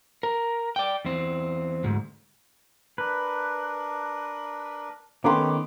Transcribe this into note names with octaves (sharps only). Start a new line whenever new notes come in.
A#4
D5 G5
E2 C4
D2 G#2
D4 A#4 B4
D#3 A3 B3 C#4 G4 C6 D6